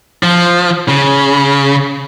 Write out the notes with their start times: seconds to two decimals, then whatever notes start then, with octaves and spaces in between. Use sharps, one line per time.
0.23 F3
0.89 C#3